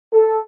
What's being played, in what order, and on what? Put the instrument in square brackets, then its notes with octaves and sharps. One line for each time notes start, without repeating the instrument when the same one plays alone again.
[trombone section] A4